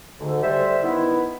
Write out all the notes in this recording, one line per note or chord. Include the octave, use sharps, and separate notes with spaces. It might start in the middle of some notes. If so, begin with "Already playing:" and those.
D2 G#2 D3
G3 C5 E5
D#3 B3 E4